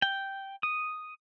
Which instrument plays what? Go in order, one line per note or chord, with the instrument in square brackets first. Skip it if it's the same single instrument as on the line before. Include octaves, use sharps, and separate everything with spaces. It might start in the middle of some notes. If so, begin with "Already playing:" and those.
[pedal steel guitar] G5
D#6